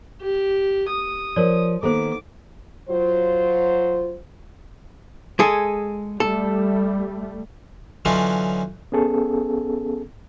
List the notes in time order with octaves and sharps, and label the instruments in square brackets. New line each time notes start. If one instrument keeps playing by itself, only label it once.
[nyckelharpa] G4
D#6
[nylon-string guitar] F3 [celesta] A#4 C#5 D5
[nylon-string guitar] D#3 A#3 B3 [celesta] A4 C5 [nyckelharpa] D6
[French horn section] F#3 F4 C5
[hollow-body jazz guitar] G#3 G#4 A4
[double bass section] G3 A3 [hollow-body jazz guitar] A4
[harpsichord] D3 E3 F#3 C#4 D#4 F4
[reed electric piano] B3 C#4 G#4 A4